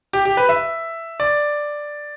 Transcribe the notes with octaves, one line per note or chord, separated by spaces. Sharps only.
G4
G4
B4
E5
D5